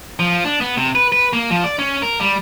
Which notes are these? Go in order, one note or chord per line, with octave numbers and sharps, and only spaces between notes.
F3
D4
B3
C3
B4
B4
A#3
F3
D5
C#4
A#4
G3